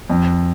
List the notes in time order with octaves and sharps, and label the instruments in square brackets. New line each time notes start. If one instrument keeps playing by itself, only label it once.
[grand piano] F2